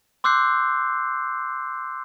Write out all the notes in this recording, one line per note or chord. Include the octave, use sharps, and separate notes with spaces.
C6 D6 E6 F#6 G6 C7